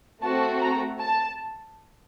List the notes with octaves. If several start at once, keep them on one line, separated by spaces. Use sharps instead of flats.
A3 C4 F#4 A4 A5
A#5
A5